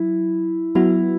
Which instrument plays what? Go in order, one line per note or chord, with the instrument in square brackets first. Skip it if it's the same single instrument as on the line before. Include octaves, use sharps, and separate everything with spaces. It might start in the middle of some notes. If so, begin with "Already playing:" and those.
Already playing: [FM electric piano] F#3 [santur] E4
[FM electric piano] F#3 B3 F#4 [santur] E4